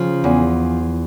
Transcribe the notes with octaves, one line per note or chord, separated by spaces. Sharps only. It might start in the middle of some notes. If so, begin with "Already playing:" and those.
Already playing: C#3 F3
E2